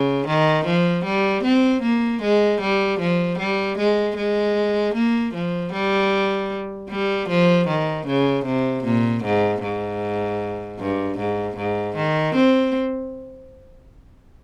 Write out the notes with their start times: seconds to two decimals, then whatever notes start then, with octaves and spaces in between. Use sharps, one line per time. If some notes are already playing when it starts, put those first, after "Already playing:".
Already playing: C#3
0.27 D#3
0.66 F3
1.05 G3
1.44 C4
1.83 A#3
2.22 G#3
2.61 G3
3.00 F3
3.39 G3
3.77 G#3
4.17 G#3
4.94 A#3
5.34 F3
5.72 G3
6.89 G3
7.28 F3
7.68 D#3
8.06 C#3
8.45 C3
8.84 A#2
9.24 G#2
9.62 G#2
10.79 G2
11.18 G#2
11.57 G#2
11.96 D#3
12.35 C4